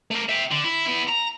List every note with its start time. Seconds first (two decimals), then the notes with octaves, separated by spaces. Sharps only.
0.11 A3 A#4
0.29 E5 G5
0.51 D3
0.64 E4
0.87 B3 E4
1.09 A#5